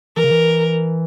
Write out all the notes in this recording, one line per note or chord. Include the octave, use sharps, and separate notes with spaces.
E3 A#4
C#3
E3